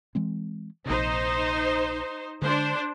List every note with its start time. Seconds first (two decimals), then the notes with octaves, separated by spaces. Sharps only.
0.15 E3 G#3 C4
0.86 A#1 C3 D#4 C5
2.42 D3 G#3 D4 C5